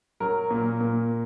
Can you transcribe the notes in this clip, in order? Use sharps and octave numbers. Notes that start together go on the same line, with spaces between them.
F#3 A#4
A#2
A#2